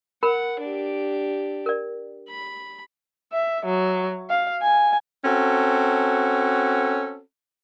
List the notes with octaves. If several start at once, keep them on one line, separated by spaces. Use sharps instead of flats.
A#4 F#5 B5
D4 G4
A#4 D5
B5
E5
F#3
F5
G#5
C4 C#4 F#4 A4